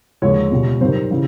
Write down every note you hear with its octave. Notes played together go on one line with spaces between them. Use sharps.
D#2 D3 F3 G#3 C#5
C#2 B2 G3
F#2 D#3 G3 C5
C#3 E3 G3